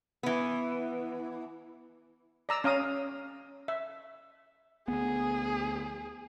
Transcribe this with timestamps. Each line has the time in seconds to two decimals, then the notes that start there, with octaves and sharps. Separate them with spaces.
0.23 E3 B3
2.49 D5 A#5 E6
2.64 C#4 F5 A#5 D#6
3.68 E5
4.88 D2 B3 G#4